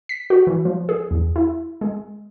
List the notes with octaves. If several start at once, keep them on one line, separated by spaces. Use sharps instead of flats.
B6
F#4
E3
F3
G#4
E2
E4
G#3